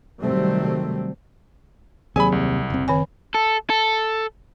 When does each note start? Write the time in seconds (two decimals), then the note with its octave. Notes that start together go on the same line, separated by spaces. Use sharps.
0.21 C3 D#3 F#3 G3 A3 C4
2.16 D#2 C3 F#3 G#4 G#5 B5
2.32 C2
2.70 F#1 C4
2.88 D#3 C#5 G#5
3.34 A4
3.70 A4